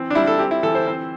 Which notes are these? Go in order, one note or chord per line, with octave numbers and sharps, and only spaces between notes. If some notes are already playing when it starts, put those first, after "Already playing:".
Already playing: E3 C4
D4
G3 E4
A4
C4 G4
E4
E3 A4
C5
C4